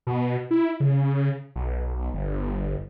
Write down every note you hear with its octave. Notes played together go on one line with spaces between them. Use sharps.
B2
E4
C#3
B1
G1